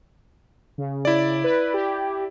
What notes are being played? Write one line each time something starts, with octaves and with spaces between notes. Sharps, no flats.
C#3
E4 D5
B4
G4